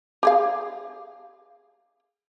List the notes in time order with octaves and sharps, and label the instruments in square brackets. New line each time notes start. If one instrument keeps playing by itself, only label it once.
[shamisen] G4 G#4 F5